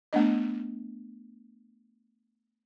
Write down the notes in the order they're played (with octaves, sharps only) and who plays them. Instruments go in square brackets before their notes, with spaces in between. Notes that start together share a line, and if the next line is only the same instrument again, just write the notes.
[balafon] A3 B3 D4 D#5